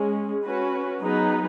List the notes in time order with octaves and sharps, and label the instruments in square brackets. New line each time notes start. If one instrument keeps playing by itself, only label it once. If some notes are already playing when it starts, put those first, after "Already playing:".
Already playing: [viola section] G#3 C#4 G#4
C#4 F#4 B4
F#3 B3 D#4 G#4 B4